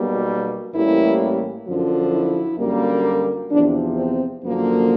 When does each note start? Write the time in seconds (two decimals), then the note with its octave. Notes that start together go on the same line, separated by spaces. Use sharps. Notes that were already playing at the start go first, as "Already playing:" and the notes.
Already playing: B1 B2 G3 A#3
0.73 A1 A2 E3 G3 A#3 E4
1.66 F#2 D3 F3
2.11 E4
2.58 F#2 D3 G3 A#3
3.50 E2 C3 F3 D4
3.95 C4
4.42 F#2 D3 F3 A#3